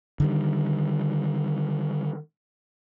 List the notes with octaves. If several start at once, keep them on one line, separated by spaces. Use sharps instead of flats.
D3 D#3 G3